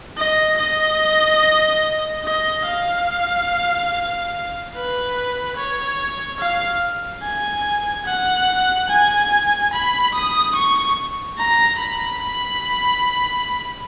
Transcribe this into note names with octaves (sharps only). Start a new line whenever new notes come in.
D#5
D#5
D#5
F5
B4
C#5
F5
G#5
F#5
G#5
B5
D#6
C#6
A#5
B5